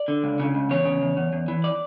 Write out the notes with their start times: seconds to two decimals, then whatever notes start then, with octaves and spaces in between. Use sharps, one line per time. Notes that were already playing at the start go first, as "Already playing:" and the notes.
Already playing: D5
0.08 D3
0.24 C#2
0.39 C#3
0.55 C#2
0.70 E2 C#5
0.85 C#3
1.02 E2
1.17 E2
1.33 E2
1.48 E3
1.64 D5